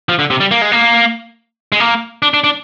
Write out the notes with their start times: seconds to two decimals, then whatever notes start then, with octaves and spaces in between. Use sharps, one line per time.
0.09 F3
0.19 D3
0.30 C3
0.40 G3
0.51 A#3
0.62 G#3
0.72 A#3
1.72 G#3
1.80 A#3
2.22 D4
2.34 D4
2.44 D4